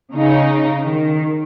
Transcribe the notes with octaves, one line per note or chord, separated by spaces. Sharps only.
C#3 D#4
D#3